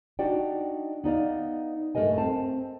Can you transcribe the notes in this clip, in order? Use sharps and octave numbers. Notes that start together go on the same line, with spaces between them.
D4 D#4 F#4 D5 G5
B3 D#4 D5 F5
G2 A3 G#4 A#4 D#5 G#5
C4 A5